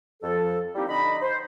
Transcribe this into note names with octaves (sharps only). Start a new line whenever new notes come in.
F2 F3 A4
G3 A#3 C4 D#4 E4 G4
D3 D#4 D#5 B5
C5